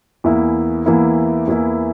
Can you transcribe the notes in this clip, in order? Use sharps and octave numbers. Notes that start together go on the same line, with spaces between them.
E2 E3 A#3 E4
E2 E3 A#3 E4
E2 E3 A#3 E4